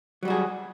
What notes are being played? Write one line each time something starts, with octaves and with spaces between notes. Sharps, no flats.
F#3 G3 F#4 G#4